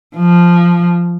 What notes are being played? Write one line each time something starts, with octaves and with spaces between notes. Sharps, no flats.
F3